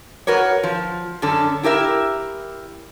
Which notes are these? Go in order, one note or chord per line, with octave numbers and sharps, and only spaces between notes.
F#4 A#4 B4 C#5
F3
F#2 D3 C#4 A4
E4 G4 A#4 E5